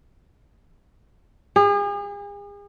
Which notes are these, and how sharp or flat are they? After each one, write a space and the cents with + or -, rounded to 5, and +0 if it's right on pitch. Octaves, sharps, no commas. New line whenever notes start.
G#4 -40